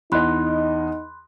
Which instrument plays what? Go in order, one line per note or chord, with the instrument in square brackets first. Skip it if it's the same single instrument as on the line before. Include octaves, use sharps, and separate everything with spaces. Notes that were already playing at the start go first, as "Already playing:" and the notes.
[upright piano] E2 D#5 [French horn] D#4 [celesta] B5 C6 F#6